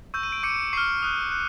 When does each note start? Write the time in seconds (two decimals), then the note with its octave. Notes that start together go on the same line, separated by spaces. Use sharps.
0.14 C#6 E6 G6
0.23 D#7
0.32 D7
0.43 D6 G6 C#7
0.73 C#6 F6 C7
1.02 D#6 F#6
1.31 F#6